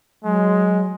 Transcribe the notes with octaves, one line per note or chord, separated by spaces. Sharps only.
F#3 G#3